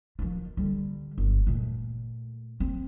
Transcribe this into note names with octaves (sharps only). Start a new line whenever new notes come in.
D#3 F3
D3 G3
G1
A#2 A3
C4